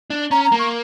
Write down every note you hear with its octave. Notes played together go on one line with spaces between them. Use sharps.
D4
C#4 A#5
A#5
A#3
C#6